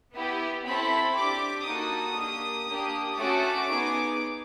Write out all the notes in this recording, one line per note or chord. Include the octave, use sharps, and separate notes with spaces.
B3 E4 G4
C4 E4 A4 B5
D4 G4 D6
A#3 D#4 F#4 A4 D#6
A#3 D4 G4
A#3 D4 G4
A3 C#4 F#4 A4 D6
B3 D#4 G#4